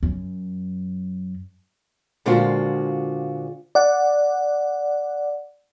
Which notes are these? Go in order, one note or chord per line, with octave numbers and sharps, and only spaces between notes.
F#2
A#2 D3 G#3 C4 F4 F#4
D5 F#5